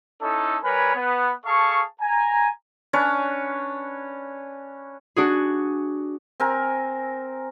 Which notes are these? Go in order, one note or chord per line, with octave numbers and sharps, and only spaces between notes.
C#4 D#4 E4 A4
G3 A#4 B4 C#5 G#5 B5
B3
G#4 A4 F5 A5 C#6
G#5 A#5
C#4 D4 B4 C#5
D4 F#4 G#4
C4 A#4 G#5